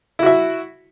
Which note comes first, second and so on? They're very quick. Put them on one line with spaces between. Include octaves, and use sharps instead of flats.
E4 F#4 E5